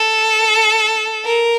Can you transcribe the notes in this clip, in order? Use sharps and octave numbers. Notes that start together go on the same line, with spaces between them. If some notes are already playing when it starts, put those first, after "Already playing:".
Already playing: A4
A#4